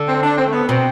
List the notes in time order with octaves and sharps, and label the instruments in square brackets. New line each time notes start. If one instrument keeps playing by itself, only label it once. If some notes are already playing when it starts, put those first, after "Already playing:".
Already playing: [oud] D3
[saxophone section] C4
D4
C4
A3
B3
[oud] B2 [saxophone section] C4